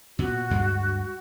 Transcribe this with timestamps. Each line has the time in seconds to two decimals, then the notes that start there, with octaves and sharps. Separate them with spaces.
0.19 A#2 B3 F#4
0.50 D2 G2 G#3